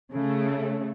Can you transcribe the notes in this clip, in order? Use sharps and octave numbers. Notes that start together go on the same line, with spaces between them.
C#3 A3